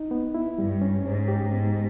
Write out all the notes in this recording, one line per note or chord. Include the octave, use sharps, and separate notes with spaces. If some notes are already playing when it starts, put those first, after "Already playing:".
Already playing: D#4
B3
E4
G2 G3
C#4
G#2 C#4
G4
G#2 B3